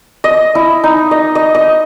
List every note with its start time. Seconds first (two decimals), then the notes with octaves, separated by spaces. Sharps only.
0.24 D#5
0.55 E4
0.84 D#4
1.11 D#5
1.35 D#5
1.55 D#5